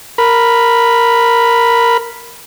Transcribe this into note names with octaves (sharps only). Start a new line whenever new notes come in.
A#4 B5